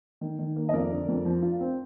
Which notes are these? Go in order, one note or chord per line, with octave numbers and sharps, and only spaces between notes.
D#3
D#3
A#3
D#5
F2 A#4 D5
D3
F2
F3
F4
C4